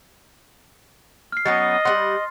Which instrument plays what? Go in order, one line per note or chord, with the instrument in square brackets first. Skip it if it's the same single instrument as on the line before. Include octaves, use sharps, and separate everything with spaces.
[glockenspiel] F6 C7
[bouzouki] F#3 B3 C#4 [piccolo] D#5 [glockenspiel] A6
[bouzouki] G3 C4 F#5 [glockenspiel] C6